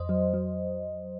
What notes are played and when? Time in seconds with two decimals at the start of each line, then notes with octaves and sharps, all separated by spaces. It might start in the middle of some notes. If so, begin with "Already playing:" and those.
Already playing: F2 C5 D#5
0.09 F#3
0.34 F#3